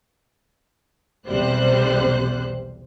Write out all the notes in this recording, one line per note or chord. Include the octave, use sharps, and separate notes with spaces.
B1 E2 C3 G3 C5 F#6